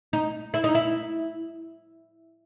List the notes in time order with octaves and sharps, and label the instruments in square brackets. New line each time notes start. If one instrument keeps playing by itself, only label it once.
[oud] D#4
E4
D#4
E4